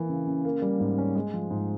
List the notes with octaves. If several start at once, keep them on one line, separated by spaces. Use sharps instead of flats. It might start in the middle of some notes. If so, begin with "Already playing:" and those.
Already playing: E3 A#3
C#3
C#3
A#3
G3
G#2
C#4
G#3
F3
G#2